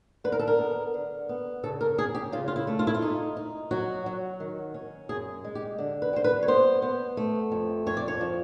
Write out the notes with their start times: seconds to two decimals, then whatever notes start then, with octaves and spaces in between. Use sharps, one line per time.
0.24 D3 B4
0.32 A#4
0.39 A4
0.48 A#4
0.59 B3
0.94 D3
1.29 B3
1.63 C#3 A4
1.81 A#4
1.98 C#3 G#4
2.15 G4
2.32 C#3 F4
2.48 F4
2.56 E4
2.67 A3
2.79 F4
2.87 E4
2.94 F4
3.02 D#4
3.37 D#4
3.71 F#3 F#4
4.06 F#3
4.40 D#3
4.74 C#4
5.09 F#2 G#4
5.45 G#3
5.55 G4
5.78 D3
6.02 B4
6.13 G3 C5
6.24 B4
6.43 C#5
6.48 B3 C5
6.82 B3
7.17 A3
7.52 F2
7.86 F2 C#5
7.97 D5
8.08 C#5
8.21 F3